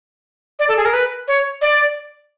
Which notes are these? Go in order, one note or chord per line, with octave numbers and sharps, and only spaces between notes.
D5
A4
G#4
A#4
B4
C#5
D5